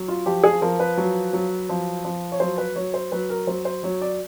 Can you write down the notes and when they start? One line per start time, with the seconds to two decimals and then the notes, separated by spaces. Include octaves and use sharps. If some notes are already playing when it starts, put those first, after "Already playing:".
Already playing: F#3
0.08 F4
0.26 F3 G4
0.44 G#4
0.61 F3 A#4
0.79 B4
0.97 F#3
1.33 F#3
1.69 F3
2.04 F3
2.32 C#5
2.40 F#3 C5
2.58 B4
2.76 F#3 C#5
2.94 C5
3.12 F#3 B4
3.30 A#4
3.47 F#3 C5
3.65 C5
3.83 F#3 C#5
4.02 D5